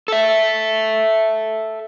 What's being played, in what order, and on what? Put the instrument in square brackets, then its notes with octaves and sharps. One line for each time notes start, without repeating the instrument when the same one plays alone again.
[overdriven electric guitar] A4 E5